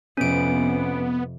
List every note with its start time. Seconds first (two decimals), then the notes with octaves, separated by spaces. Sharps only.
0.17 F2 C3 B3 C#4 D7